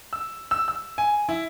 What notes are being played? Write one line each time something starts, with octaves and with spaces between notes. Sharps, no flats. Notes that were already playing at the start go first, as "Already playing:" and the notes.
E6
E6
E6
G#5
E4